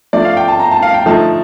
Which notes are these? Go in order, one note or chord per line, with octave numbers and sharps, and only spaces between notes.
F3 A3 D4 D5
F5
G5
A5
A#5
A5
F5
G5
D3 F3 A3 D#4 A5